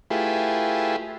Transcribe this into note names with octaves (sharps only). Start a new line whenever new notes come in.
A3 E4 F4 G4 G#4 B4